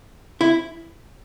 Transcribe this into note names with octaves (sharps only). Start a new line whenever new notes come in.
E4